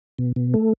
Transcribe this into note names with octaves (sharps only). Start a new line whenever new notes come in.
B2
B2
A3